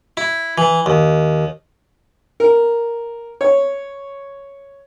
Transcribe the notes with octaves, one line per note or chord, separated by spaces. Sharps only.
E4
E3
D#2
A#4
C#5